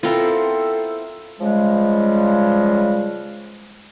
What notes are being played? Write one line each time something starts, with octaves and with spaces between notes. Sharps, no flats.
B3 C4 E4 F4 A4 A#4
C#3 F3 G3 G#3